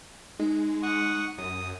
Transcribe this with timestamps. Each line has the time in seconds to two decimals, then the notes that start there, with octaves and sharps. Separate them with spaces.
0.39 G#3 D#4
0.83 F#5 C#6 D#6
1.38 F#2 D#6